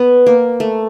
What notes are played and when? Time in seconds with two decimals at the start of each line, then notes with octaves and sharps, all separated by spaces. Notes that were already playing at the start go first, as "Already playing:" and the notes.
Already playing: B3
0.26 A#3
0.60 A3